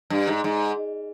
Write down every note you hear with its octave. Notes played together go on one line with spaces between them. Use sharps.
G2
G#2
G#2